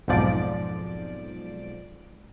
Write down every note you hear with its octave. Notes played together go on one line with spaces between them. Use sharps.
B1 F2 G#2 F3 D5 D7